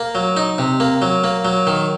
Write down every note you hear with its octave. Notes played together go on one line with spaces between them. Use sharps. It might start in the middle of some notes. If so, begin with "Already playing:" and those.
Already playing: A#3
F#3
D#4
C3
A#3
F#3
A#3
F#3
D#3